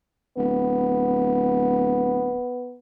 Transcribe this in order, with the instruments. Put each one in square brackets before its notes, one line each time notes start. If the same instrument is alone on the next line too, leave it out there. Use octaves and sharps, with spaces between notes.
[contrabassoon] D1 [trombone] B3